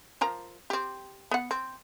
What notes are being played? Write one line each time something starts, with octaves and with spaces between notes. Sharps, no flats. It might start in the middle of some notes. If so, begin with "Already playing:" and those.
F3 A#4 A#5
C4 G4
B3 F#5
C4